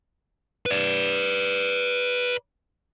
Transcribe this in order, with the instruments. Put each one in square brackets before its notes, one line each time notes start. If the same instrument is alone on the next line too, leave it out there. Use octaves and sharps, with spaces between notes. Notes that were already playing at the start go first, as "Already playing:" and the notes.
[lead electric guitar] B4 D5